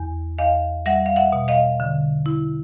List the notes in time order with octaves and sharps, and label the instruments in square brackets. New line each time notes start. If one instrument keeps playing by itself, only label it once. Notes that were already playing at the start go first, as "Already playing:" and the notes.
Already playing: [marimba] E2
E2 D#5 F5
G3 E5 F#5
F5
E5 F#5
B2
D#5 F5
D3
E4